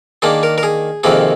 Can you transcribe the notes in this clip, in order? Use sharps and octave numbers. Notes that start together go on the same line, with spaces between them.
D#3 A#3 D4 G#4
A#4
A#4
G#4
F2 C3 D#3 A#3 G#4